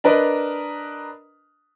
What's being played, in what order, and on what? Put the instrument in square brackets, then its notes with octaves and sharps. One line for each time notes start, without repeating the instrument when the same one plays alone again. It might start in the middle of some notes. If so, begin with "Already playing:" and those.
[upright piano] D4 A#4 B4 D#5 A#5